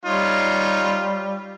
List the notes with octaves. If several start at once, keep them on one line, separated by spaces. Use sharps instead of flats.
G3 D#4 F4 C#5